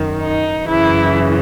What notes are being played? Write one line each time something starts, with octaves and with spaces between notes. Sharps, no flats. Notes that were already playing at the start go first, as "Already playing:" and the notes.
Already playing: F#2 D#3
D#4
F#2 C#3 E3 E4